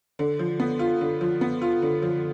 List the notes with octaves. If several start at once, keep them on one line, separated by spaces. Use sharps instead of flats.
D3
F3
B3
F4
D3
F3
B3
F4
D3
F3